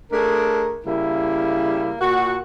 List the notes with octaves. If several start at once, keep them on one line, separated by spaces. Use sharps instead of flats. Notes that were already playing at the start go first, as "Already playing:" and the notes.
A3 D4 G#4 A#4
C#3 G3 A#3 E4
A#2 F#4